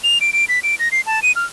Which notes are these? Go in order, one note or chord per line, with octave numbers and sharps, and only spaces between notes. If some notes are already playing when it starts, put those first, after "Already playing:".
F7
D7
D7
B6
D7
A#6
C7
A5
D#7
F6